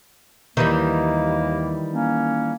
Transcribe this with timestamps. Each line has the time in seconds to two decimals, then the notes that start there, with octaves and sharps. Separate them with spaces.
0.57 D#2 D#3 E3 G3 A#3
1.94 A#3 C#4